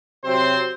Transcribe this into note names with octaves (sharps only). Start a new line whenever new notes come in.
C3 F#3 C4 C5